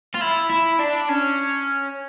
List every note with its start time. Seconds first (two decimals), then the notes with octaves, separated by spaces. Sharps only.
0.15 F4
0.21 E4
0.50 E4
0.80 D4
1.09 C#4